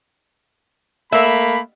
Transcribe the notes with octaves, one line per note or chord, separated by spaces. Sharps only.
A3 A#3 E5 B5